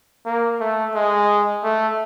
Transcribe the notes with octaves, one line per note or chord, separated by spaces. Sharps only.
A#3
A3
G#3
A3